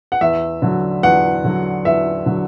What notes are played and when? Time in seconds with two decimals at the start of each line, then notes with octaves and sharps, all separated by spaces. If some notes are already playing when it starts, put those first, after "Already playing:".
0.12 F#5
0.21 E2 E5
0.62 D3 F#3
1.03 E2 F#5
1.44 D3 F#3
1.85 E2 E5
2.26 D3 F#3